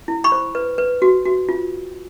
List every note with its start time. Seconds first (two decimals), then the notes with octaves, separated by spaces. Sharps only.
0.08 E4
0.24 B5 C#6
0.32 C5
0.55 B4
0.78 B4
1.02 F#4
1.25 F#4
1.49 F4